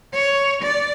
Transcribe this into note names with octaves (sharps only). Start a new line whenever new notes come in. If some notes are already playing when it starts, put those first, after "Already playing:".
C#5
D5